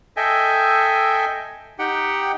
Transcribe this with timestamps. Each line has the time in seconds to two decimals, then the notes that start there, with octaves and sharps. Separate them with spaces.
0.17 A4 D#5 E5 G5 G#5
1.79 D#4 G4 F#5 G5